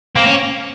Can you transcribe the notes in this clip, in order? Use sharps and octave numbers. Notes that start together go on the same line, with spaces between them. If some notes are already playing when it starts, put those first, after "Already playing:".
A#3 C4
C#4